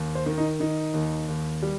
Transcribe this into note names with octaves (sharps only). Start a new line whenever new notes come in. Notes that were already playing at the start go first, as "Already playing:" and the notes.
Already playing: D#2
C5
D#3
D#4
D#3 D#4
D#2
D#2
G3